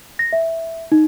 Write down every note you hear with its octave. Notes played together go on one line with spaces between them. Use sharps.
A#6
E5
D#4